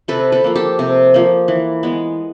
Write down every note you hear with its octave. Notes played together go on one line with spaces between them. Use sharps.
C3 A4 B4
A4 B4
F3 A#3
G4 A4
C3
F3 A#3
E3
G#3 B3